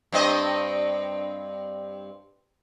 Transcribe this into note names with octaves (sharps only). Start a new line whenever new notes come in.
G2 C4 D#5